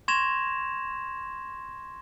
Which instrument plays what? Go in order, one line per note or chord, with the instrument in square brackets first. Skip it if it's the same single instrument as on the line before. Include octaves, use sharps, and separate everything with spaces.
[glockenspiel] C6 C#6 G#6 A#6 E7 F7